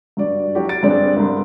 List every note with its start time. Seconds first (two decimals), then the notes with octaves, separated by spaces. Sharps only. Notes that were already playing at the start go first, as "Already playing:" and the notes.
0.17 G2 F#4 D5
0.55 F#3 D4 E4 F#4 G4
0.69 A6 D7
0.83 G2 C4 D4 G#4
1.16 C2 G2 C6